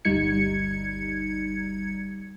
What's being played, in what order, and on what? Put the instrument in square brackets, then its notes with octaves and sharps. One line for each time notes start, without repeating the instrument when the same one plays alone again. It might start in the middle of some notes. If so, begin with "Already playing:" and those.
[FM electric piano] G1 D2 G3 D#4 G#6 C#7